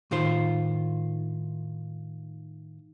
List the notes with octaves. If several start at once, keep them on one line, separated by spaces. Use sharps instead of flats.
A2 D#3 F4 C5